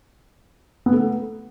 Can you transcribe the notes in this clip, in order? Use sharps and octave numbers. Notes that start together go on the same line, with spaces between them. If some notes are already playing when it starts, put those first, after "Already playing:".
B3
A3